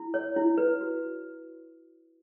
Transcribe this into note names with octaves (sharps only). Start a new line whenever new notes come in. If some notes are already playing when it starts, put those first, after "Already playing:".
Already playing: E4
C#5
E4
B4
F#4